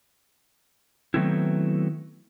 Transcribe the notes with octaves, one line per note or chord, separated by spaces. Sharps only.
D#3 F#3 A3 B3 C4 E4